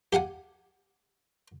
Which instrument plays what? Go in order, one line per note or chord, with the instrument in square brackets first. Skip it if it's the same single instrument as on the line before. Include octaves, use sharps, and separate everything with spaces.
[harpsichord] G4 F5 F#5 G#5